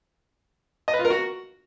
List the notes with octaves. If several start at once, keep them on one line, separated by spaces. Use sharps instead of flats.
D#5
B4
F4
A#4
F#4